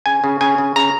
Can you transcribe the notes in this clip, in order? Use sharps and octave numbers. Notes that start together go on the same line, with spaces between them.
C#3 G#5
C#3
C#3 G#5
C#3
C#3 A#5